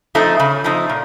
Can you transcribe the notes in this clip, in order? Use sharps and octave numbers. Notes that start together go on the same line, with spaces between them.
F3 A3 C4 D#4
C#3
F3 A3 C4 D#4
A#2